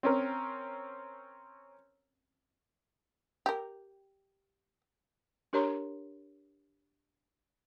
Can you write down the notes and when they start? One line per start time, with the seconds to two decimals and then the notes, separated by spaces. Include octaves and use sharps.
0.03 C4 C#4 A#4
3.46 G4 A#4
5.53 D4 G4 A#4 C#5 A#5 C6